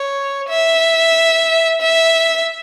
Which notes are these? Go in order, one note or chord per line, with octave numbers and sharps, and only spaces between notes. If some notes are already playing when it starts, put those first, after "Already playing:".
Already playing: C#5
E5
E5